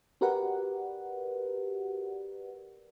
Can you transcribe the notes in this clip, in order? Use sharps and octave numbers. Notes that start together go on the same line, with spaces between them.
F#4 G4 A#4 B4 D5 F#5